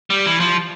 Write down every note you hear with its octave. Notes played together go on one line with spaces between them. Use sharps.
G3
E3
F3